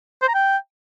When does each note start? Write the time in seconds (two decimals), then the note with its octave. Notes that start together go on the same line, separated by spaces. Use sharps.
0.22 C5
0.28 A#5
0.35 G5